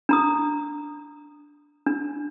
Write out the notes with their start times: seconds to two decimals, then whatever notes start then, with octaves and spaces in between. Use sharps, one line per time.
0.09 D4 A#5 D#6
1.86 D4